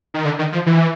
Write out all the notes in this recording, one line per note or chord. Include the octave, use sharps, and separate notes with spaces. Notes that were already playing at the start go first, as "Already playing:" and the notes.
D#3
D3
D#3
F3
E3